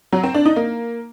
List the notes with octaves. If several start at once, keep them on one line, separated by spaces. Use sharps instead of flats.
F#3
C4
D4
D#4
A#3